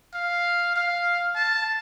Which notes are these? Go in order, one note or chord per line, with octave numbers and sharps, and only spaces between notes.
F5
F5
A5